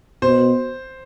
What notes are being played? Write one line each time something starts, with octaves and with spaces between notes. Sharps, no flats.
B2 C5